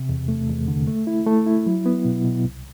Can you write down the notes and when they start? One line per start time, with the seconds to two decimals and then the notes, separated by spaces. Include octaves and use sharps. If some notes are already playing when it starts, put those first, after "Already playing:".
Already playing: C3
0.09 E2
0.28 A3
0.49 E2
0.68 D3
0.87 A3
1.07 E4
1.26 A3
1.46 E4
1.66 F#3
1.86 B3
2.05 B2
2.24 B2
2.44 C2